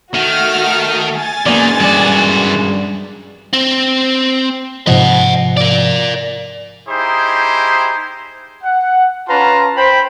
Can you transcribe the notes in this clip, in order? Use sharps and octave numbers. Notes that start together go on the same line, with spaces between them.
D#3 A3 F#4 F6
G#5 A6
F#2 D#3 G#3 A#3 B3 D5
G2 E3 F#4 D5
C4
G#2 C3 F3 D#5 F#5
A#4 D5
D#4 E4 G4 G#4 C5
F#5
C#4 F4 B4 A5 A#5 C6
C5 G5 B5